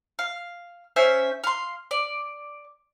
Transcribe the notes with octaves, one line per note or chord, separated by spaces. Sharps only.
F5
C#4 C5 E5 G#5
F5 C6
D5